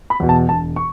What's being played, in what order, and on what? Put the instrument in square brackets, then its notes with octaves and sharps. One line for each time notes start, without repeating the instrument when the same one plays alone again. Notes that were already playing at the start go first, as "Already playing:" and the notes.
[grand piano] B5
E2 B2
A5
E1 A5
C#6